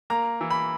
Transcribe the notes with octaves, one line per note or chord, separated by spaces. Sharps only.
A#3 A#5
E3
B5